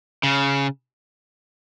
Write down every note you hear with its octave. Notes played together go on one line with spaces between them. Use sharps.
C#3